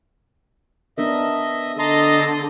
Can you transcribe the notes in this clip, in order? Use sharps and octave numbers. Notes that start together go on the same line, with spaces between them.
B3 D4 A#4 D#5 E5
D3 D#5 A5 A#5 C6